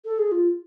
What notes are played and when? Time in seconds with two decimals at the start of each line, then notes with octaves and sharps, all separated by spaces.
0.05 A4
0.19 G#4
0.32 F4